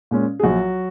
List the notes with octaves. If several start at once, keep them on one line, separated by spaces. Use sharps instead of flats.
A#2 G#3 C#4
G#4
A#1 F#3 F#4